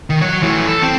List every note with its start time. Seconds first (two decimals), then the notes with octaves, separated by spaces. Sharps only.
0.10 D#3
0.21 F#3 C#5
0.43 E3 A3
0.66 A4
0.82 C4